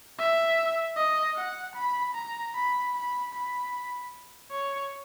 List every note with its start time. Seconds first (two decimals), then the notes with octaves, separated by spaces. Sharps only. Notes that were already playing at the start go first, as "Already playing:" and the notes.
0.19 E5
0.96 D#5
1.36 F#5
1.75 B5
2.15 A#5
2.54 B5
2.94 B5
3.34 B5
4.51 C#5